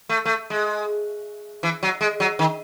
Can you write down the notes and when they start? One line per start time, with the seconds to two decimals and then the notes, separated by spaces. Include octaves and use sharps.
0.09 A3
0.25 A3
0.50 G#3
1.63 E3
1.83 F#3
2.01 G#3
2.20 F#3
2.39 D#3